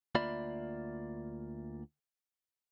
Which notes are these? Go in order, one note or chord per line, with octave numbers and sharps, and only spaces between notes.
D2 A#3 F4 D5 E5 B5